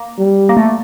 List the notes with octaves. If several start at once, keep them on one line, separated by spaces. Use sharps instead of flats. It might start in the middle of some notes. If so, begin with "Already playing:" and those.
Already playing: A#3
G3
A#3
A3